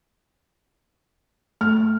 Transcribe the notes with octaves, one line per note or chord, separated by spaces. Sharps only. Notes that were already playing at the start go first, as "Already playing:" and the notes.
A3 F6